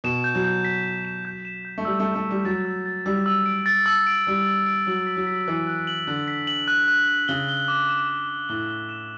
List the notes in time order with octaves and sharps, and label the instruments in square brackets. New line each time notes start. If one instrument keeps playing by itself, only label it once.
[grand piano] B2 [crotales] E7
[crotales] G6
[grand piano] F#3
[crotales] G6
B6
B6
E7
G6
E7
G6
[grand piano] A3
[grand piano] G3 [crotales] E6
[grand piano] A3
[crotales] E6
[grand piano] A3
[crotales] E6
[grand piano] G3
[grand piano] F#3 [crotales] A6
[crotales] E6
A6
[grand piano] G3 [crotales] E6
[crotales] E6
D7
A6
E6
D7
[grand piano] G3 [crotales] D7
[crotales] A6
D7
[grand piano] F#3 [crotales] F#7
[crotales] B6
[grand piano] F#3
[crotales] B6
[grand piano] E3 [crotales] F#6
[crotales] F#6
F#7
[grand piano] D3 [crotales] F#6
[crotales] B6
F#7
F#6
F#6
F#6
[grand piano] C#3 [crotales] G7
[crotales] G7
D6
E7
D6
D6
[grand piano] A2 [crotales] G7
[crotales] G7
E7